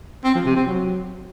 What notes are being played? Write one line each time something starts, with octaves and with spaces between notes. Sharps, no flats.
C4
F3
C3
C4
F#3